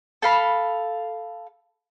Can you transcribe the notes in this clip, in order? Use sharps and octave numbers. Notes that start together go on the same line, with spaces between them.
A4 F5 B5